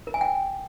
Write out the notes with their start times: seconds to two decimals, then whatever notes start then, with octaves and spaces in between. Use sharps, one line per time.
0.07 A#4
0.14 G#5
0.21 G5